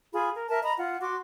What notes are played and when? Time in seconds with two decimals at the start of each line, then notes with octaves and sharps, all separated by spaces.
0.13 F4 G#4 B5
0.35 A#4
0.49 A#4 E5 A5
0.62 D#5 A#5 B5
0.76 F4 F#5
1.00 F#4 C6 D6